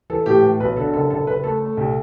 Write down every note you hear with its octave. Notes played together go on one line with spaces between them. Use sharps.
E3 A4
A2 G4
E3
B1 B4
D3 A4
F#1 A4
F#1 A4
F#1 B4
A3 A4
A3
C2